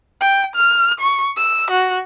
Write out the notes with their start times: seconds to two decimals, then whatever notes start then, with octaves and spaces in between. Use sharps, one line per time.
0.21 G5
0.56 F6
1.00 C#6
1.37 E6
1.71 F#4